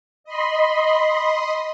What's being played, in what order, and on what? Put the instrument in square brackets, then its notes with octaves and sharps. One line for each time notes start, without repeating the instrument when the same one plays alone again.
[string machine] D#5 B5 C6